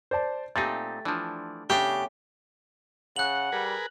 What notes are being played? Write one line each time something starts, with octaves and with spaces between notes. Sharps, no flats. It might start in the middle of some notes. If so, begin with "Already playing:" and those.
C5 D5 A5
A#2 A3 C4 D#4 G4 A6
E3 F3 D4
C#3 A3 B3 C#4 D4 G4 G6
C#3 F#5 F#6 F#7
G3 G#4 A#4 B4